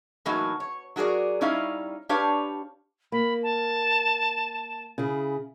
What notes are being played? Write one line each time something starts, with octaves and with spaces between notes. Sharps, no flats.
A2 E3 F#3 A#3 D#4 F#4
C#5
F#3 F#4 G#4 A#4 D5
G3 C#4 D#4 E4 F5
D4 G4 B4 C#5 F5
A#3 B5
A5
C#3 E4 G#4